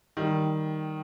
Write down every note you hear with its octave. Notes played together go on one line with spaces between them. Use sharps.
D#3 G3